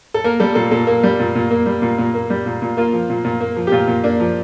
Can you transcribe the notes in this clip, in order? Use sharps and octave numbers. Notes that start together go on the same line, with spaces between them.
A4
A#3 A#4
G3 A4
A#2 A4
A#2 A4
A#3
G3
A#2
A#2
A#3
G3
A#2
A#2
A#3
G3
A#2
A#2
A#3 F4
F3
A#2
A#2
A#3
F3
G4
A#2 F4
A#2
A#3 D4
F3